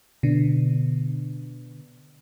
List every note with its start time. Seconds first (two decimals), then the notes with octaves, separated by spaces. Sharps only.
0.23 B2 D3